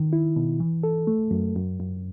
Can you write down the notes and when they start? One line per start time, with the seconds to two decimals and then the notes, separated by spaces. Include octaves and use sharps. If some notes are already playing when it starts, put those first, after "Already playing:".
Already playing: D#3
0.13 E4
0.36 B2
0.60 E3
0.83 A4
1.07 A3
1.31 F#2
1.56 F#2
1.80 F#2